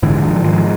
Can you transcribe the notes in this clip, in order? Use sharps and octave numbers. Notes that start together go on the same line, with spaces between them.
G#2 D3 E3
D#3 F3
G#2 D#3 F3